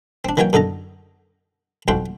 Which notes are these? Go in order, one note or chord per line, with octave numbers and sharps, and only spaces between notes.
C4 D4
D#3 E3 F#3 A#3 C#5 G5
F#2 D3 D#4 A4 A#5
B1 F2 F#4 G5 C6